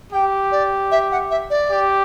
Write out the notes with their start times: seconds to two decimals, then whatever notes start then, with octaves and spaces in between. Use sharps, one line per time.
0.12 G4 G5
0.52 D5
0.91 E5
1.12 F#5
1.31 E5
1.50 D5
1.70 G4